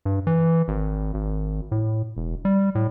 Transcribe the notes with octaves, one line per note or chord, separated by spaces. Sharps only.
G2
E3
G#1
G#1
A2
E1
G3
A2